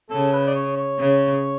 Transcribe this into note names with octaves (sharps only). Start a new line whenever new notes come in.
C#3 A4
B4
D5
C#5
C#5
C#3